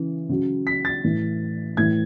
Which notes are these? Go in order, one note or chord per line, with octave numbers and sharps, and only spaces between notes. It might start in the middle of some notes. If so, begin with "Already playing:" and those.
Already playing: C#3 E3
C#3 F#3
B6
A6
A2 E3
A2 E3 G#6